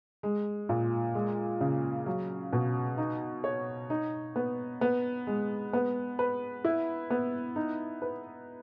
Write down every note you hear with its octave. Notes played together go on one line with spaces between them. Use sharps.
G#3
A#2
G#3
C#3
F#3
B2
D#4
C#5
D#4
B3
B3
G#3
B3
B4
E4
B3
D#4
B4